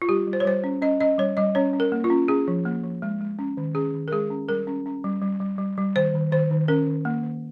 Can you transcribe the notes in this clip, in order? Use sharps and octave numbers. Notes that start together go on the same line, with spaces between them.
F4
G3 G4
G3
C5
C#5
G3 C5
C#4
C#4 D#5
C#4 D#5
G3 C#5
G3 D#5
C#4 C#5
C#4
A#4
A#3
F4
C#4
C#4 G#4
F3
A#3
F3
G#3
G#3
C#4
D#3
C#4 G#4
D#3
A#4
G#3 G#4
C#4
G3 A#4
C#4
C#4
G3
G3
G3
G3
G3
D#3 C5
D#3
D#3 C5
D#3
C#4 A#4
D#3
A#3
D#3